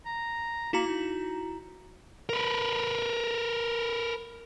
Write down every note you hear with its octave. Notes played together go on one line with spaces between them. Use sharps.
A#5
A#3 E4 F#4 A#5
D#4
A#4 B4